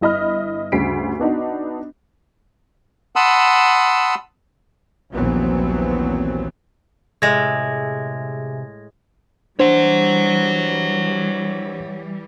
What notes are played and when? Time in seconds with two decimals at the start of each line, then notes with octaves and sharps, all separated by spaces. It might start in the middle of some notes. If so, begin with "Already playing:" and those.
0.01 G1 E4 D#5 B5 F6
0.72 D2 G2 C#3 B6 C7 D7
1.19 B3 D4 D#4 F#4
3.16 F#5 A5 B5 C6 D#6 E6
5.13 A#1 D#2 E3 F#3 B3 C4
7.22 A2 C3 G#3 G#4 E5 G#5 G#6 A#6
9.59 E3 G3 D4 C5 C#5 F#5